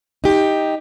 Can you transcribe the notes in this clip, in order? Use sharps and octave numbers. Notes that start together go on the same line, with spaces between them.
D#4 G4